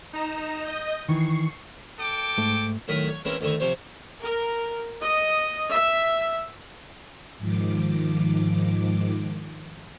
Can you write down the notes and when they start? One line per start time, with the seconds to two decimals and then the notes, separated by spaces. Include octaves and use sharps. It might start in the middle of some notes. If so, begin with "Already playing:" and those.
0.13 D#4 A#5 E7
0.65 D#5 D#6 G6
1.09 D#3 E3 C#6 C7
1.99 A4 G5 D6
2.38 G#2 A3
2.88 A2 D#3 F#3 A#4 B5 D#6
3.08 C#5
3.25 E3 G#3 A#3 C4 C#4 E4
3.41 D2 D#3 D#4 E4 C#6
3.60 C3 F3 C5 C#5
4.23 A#4
5.02 D#5
5.73 E5
7.39 G#2 D#3 F3 D6